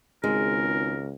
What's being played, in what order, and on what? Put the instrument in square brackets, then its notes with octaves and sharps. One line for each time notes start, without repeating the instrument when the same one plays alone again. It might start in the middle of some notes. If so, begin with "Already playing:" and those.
[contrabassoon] G#1 [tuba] C#2 [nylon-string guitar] G#3 [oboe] A#4